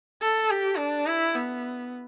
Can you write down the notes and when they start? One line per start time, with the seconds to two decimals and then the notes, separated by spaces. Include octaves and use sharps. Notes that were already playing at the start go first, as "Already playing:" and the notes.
0.22 A4
0.51 G4
0.78 D4
1.07 E4
1.35 B3